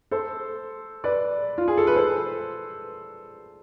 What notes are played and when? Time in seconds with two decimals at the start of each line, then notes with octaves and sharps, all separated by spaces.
0.11 A4 C5
1.04 B4 D5
1.58 F4
1.68 G#4
1.77 A4
1.87 B4
1.96 A4 C5